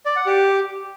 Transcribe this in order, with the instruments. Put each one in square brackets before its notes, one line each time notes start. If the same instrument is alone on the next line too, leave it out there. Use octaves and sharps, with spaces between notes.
[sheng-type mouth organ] D5
F#5
G4